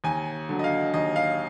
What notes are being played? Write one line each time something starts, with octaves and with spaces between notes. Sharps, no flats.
D#2 G#5
D3 F#3
D#5
F5
D#2 D#5
F5